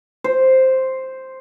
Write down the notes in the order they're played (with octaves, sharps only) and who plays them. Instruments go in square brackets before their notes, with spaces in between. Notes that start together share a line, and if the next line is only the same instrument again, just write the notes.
[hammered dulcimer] C5